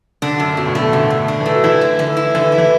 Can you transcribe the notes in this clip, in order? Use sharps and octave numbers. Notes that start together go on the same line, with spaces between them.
D3 D4
F#2
B2 A3
A2
B2 A3
F#2 D3
F#2
D4
E3
A3
F#3
E3 E4
D3
D3 E3
E4
D3 E3
E4
E3